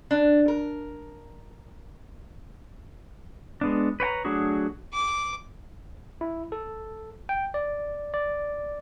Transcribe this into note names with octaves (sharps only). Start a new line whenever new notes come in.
D4
A#4
G#3 B3 D4
B4 C#5 G5 A#5
F#3 A3 D4 F#4 G#4
D6
E4
A4
G5
D5
D5